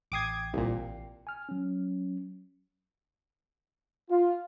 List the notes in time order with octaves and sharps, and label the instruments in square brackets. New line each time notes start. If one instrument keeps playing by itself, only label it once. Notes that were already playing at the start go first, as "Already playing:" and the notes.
[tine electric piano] A1 G5 C7 [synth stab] D6 D#6 G#6
[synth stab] C2 A#2
[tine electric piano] G#5 F6
F#3 C#4
[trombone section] F4